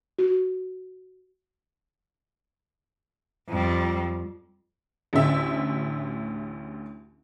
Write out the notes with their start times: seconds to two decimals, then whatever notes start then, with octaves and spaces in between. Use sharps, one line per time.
0.19 F#4
3.49 F2 G3
5.13 A1 D2 E5